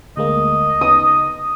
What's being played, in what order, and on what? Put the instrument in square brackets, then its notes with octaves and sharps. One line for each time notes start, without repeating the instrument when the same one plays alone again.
[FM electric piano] D2 G#3 A#3 [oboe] D#5
[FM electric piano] C#3 B3 D#4 [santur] D#6